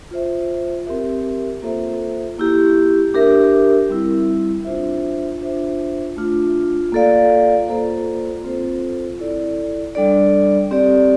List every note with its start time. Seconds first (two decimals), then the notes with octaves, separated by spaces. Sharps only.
0.11 F4 C5 E5
0.86 C4 G4 A#4 E5
1.62 A#3 F4 A4 C5 E5
2.38 A#3 E4 G4
3.14 D4 G4 A#4 E5
3.89 G3 C4 E4
4.65 D4 F4 C5 E5
5.41 D4 F4 C5 E5
6.17 A3 D4 F4
6.92 A#3 F4 A4 D5 F5
7.68 A#3 F4 A4 C5
8.44 C4 F4 A4 C5
9.19 E4 A4 D5
9.95 G3 D4 A4 D5
10.71 C4 G4 D5